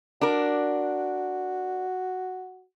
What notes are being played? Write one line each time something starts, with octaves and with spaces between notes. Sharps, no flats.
D4 F#4 A#4